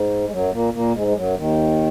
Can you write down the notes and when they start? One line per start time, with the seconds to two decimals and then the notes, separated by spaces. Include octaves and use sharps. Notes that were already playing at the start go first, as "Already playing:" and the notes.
Already playing: G#2
0.26 G#3
0.32 F#2 F#3
0.53 A#2 A#3
0.73 A#2 A#3
0.94 G#2 G#3
1.07 G#3
1.16 F#2 F#3
1.37 D#2 D#3